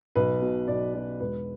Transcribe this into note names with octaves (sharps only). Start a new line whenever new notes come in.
B1 B4
B2
B1 D5
B2 D5
E1 B4